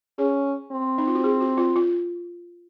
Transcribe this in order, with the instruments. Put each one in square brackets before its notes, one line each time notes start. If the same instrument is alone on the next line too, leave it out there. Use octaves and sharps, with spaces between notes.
[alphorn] C#4 [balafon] G#4
[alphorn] C4
[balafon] D#4
F4
F#4
G#4
F#4
F4
F4